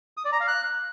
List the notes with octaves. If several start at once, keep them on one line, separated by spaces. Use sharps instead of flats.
D#6
D5
A#5
F5
F#6